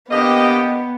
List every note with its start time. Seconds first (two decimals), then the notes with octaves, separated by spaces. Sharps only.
0.11 D3 A#3 B3 G4 D#5